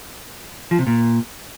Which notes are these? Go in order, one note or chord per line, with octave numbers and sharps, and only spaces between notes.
F3
C3
A#2